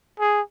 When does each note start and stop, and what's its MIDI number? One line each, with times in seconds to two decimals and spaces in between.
0.20 0.41 68